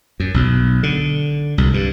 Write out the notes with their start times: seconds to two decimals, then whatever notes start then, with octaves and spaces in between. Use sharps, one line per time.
0.20 F#2
0.34 B1
0.83 D3
1.58 C2
1.74 G2